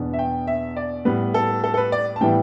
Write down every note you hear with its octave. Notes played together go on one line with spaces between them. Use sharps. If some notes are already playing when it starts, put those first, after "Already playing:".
Already playing: E2 B2 B3 D4
E5
G5
E5
D5
A2 G3 B3 B4
A4
A4
A4
B4
D5
A5
A2 E3 G3 B3 E4 G5